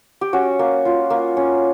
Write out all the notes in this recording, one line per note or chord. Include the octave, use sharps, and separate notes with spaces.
G4
C#4 F#4
A#3
F4
A#3
C#4